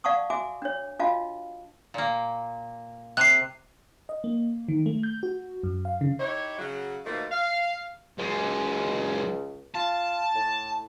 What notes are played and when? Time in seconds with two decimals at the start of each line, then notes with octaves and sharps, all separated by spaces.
0.04 D5 F5 F#5 A5 C#6 D#6
0.30 F#4 E5 G#5 D6
0.62 D4 C#5
0.99 D4 F4 F#4 D#5 F5 A5
1.94 A#2 A#3
3.17 C3 F#6 C7
4.09 D#5
4.24 A#3
4.68 D#3
4.86 A3
5.03 G6
5.23 F#4
5.63 F#2
5.85 F5
6.01 C#3
6.19 D#4 E4 G4 C#5
6.58 C#3 F#3
7.05 B2 D#3 F3 A3 A#3
7.32 F5
8.18 C#2 F#2 G#3
9.75 F4 A5
10.35 A2